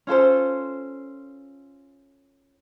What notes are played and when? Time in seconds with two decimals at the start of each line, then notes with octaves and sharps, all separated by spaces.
0.07 C#4 F4 A4 C5